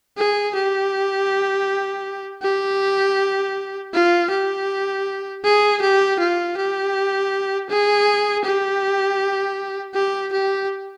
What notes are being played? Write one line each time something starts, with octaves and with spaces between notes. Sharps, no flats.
G#4
G4
G4
F4
G4
G#4
G4
F4
G4
G#4
G4
G4
G4